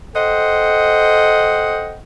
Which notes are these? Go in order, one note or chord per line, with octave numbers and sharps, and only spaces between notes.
A4 C5 D#5 F#5 G5